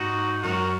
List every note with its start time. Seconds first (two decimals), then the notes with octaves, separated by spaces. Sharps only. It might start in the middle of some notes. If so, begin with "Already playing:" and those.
Already playing: G#2 D#4 F#4
0.43 F#2 F#4 A#4